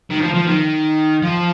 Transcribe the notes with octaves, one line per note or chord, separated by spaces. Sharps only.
D#3
F3
F3
D#3
F3